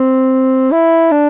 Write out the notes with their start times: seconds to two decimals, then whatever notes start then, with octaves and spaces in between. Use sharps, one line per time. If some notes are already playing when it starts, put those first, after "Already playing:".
Already playing: C4
0.72 E4
1.11 D4